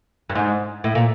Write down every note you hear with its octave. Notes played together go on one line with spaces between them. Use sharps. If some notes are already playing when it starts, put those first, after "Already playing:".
G2
G#2
A2
A#2